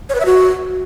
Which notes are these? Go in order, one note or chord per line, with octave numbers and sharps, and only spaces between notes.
C#5
B4
E5
F#4